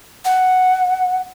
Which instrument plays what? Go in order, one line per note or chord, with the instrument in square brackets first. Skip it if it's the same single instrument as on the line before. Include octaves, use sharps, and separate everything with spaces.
[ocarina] F#5